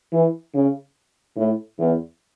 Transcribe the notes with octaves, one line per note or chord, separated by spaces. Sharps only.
E3
C#3
A2
E2